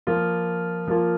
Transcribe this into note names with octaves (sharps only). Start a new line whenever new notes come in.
F3 A#3 F4
F3 A#3 F4